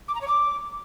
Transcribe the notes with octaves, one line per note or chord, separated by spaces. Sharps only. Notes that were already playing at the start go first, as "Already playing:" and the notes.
D6
A#5
C#5
D6